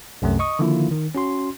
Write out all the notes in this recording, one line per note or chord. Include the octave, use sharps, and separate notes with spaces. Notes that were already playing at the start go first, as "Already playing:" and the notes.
C2 F#2 C3 A3
D#5 C#6 D#6
D3 D#3 F3 A#3 E4 F4
D#3
C#4 F#4 C6